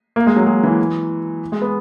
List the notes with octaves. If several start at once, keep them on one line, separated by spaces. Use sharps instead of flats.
A#3
G#3
F#3
G#3
E3
G#3
B3